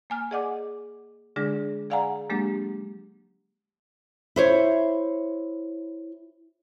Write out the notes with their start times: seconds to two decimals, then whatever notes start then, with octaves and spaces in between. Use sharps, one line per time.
0.10 A#3 G#5 F6
0.31 G#4 D5 D#5 F#5 G#5 D6
1.36 D3 G#3 D4 G#4 A#6
1.90 G#4 D5 F5 F#5 G#5 A#5
2.30 F#3 G#3 A#3 D4 G4
4.36 E4 C5 C#5